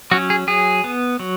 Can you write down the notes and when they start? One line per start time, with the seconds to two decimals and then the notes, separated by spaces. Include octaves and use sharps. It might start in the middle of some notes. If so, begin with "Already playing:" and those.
0.11 F#3 C#4 F#4
0.30 G#4
0.47 F#3 G#4
0.84 B3
1.20 F#3